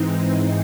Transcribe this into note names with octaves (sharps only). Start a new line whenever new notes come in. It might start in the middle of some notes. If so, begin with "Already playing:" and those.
Already playing: G#2 E3 G#3 C4 D#4